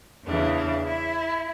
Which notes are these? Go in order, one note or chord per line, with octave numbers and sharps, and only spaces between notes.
E2 C#3 E3 D4
D4
E4